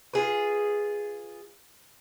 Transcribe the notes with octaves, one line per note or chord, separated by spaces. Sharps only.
F4 G#4 B4